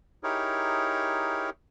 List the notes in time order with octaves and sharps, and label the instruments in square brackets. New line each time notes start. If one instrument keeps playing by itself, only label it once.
[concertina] D#4 E4 G4 G#4 A#4 C#5